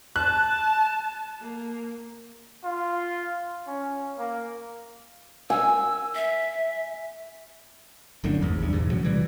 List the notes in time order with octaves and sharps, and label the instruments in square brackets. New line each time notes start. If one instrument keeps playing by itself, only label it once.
[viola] A5 [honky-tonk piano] F#6
[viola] A#3
[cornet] F4
C#4
A#3
[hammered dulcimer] G#5 [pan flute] E6
[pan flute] E5
[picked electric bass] G1 F#2 A2 D3
G#1 E2 G#2
D#1 E2 G2
B1 E2 G#2
A2 C#3 F#3
C3 E3 G3